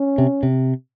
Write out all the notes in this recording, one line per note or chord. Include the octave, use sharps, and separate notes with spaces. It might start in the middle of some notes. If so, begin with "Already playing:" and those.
Already playing: C#4
C3
C3